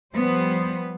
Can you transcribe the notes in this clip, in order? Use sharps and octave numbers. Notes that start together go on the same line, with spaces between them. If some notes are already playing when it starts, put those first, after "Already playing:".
F3 G3 B3 C5